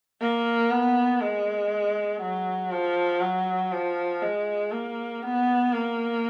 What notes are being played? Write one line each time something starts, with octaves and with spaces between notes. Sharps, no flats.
A#3
B3
G#3
F#3
F3
F#3
F3
G#3
A#3
B3
A#3